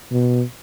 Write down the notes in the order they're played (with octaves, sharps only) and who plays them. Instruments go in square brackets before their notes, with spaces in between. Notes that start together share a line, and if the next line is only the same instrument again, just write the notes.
[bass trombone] B2